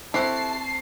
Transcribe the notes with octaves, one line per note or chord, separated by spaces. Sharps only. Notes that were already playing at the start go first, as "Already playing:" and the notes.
C4 E4 G4 A4 A5 C#6 F#6 C7